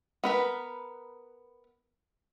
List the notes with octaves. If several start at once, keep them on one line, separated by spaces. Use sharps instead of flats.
B3 A#4 B4